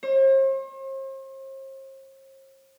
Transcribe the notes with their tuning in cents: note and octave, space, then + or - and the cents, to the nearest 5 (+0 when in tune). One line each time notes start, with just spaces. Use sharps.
C5 +45